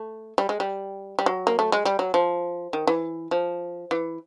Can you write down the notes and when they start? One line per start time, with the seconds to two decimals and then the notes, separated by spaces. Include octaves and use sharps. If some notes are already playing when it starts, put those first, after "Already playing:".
Already playing: A3
0.38 G3
0.49 G#3
0.60 G3
1.19 G3
1.26 F#3
1.47 A#3
1.59 A3
1.72 G#3
1.85 G3
1.99 F#3
2.14 F3
2.73 D#3
2.87 E3
3.31 F3
3.91 E3